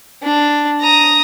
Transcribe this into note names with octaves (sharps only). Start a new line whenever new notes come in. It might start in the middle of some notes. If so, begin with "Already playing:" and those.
D4
A#5 D#6